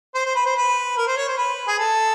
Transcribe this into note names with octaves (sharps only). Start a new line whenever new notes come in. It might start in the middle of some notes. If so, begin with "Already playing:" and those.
C5
C5
B4
C5
B4
A#4
C5
C#5
C5
B4
G#4
A4